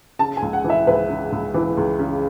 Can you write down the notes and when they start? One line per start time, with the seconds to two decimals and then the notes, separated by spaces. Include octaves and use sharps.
0.19 C#3 A5
0.37 G#5
0.42 C#2
0.53 F#5
0.64 E3
0.70 E5
0.87 C#2 B4
1.10 C#3
1.32 C#2
1.54 E3
1.77 C#2
1.99 C#3